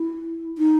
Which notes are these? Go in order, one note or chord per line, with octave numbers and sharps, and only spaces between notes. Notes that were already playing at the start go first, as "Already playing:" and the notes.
Already playing: E4
D#4